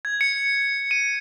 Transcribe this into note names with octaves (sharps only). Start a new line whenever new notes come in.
G#6
C#7
D#7